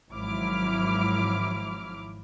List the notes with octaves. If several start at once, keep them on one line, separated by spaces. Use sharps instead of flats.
G#1 F3 F#3 E4 D6 F6